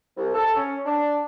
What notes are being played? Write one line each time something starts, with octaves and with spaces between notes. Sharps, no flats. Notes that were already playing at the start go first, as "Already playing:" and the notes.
C2
A4
C#4
D4